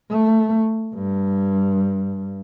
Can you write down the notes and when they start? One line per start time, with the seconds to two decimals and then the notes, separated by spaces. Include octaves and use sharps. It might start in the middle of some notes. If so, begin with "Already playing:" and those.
0.10 A3
0.95 G2